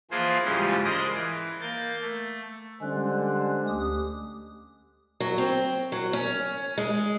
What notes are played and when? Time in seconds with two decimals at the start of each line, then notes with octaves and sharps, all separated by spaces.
0.11 E3 F3 A#3 F4 G#4 C5
0.44 G#2 C#3 E3 F3 G3 G#3
0.85 G#3 G#4 A#4 C5 D5 D#5
1.15 E3
1.61 A#3 G6 A6
2.02 A3
2.82 D3 G3 G#3 C#4 C5 F#6
3.67 D2 G4 D#6
5.20 F#3
5.38 C4
5.92 F#3
6.13 C#4
6.78 G#3